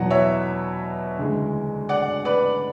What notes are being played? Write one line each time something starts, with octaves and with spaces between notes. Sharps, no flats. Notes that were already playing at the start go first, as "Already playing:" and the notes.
Already playing: E2 B2 F#3 F#5
C#5 E5
D2 C#3 E3 G#3
D5 F#5
B4 D5